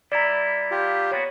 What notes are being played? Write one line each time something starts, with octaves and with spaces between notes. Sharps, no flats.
G3 E4 D5 A#5
F4 G4
A#3 B3 F#4 C#5